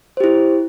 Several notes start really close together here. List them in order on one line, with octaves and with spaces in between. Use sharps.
C5 G4 E4